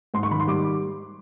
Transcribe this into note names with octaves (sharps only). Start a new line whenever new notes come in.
G#2 C6
C#6
D#3 B5
C6
G3 D6